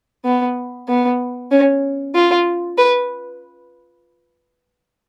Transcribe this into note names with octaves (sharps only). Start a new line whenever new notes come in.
B3
B3
C#4
F4
B4